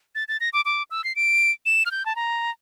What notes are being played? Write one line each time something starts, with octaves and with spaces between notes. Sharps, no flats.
A6
A6
A#6
D6
D6
E6
C7
D7
E7
F6
G6
A5
A#5